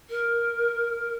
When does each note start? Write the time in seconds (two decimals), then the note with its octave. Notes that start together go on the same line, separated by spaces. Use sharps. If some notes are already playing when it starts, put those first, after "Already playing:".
0.10 A#4